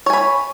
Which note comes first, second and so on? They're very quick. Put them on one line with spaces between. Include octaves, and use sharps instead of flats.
C#5 G#5 B5